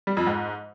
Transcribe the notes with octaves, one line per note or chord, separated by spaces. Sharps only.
G3
F2
G#2